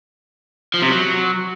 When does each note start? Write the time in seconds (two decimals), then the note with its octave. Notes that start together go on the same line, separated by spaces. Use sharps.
0.74 F3
0.82 C3
0.90 F#3